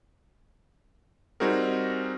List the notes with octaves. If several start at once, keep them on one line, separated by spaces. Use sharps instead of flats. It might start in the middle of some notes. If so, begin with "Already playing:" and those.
G3 C4 D#4 F#4 G#4 A#4